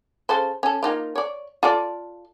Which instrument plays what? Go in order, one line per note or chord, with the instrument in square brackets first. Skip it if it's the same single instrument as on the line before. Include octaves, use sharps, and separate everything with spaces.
[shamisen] C#3 A4 C5
C#4 A4
A#3 D#4 F4
C#5 D5
F4 A4 D5